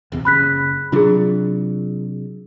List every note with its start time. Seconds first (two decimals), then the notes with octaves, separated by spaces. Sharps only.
0.12 D#1 E2 C3
0.25 F#1 C#3 B5 F#6 B6
0.92 C3 F#3 D4 F4 G#4